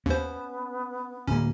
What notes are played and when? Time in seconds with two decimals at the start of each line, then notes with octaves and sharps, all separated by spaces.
0.06 D#2 B3 C#4 C5
1.28 D1 A#3 C#4